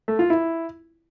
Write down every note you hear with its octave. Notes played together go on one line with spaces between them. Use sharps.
A3
F4
E4